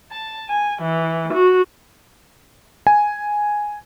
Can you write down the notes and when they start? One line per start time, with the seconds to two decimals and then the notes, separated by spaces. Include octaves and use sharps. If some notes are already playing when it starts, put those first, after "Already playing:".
0.11 A5
0.49 G#5
0.82 E3
1.33 F#4
2.87 G#5